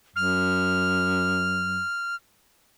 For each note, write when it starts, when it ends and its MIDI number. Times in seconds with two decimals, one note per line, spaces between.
0.16 1.82 42
0.16 2.15 89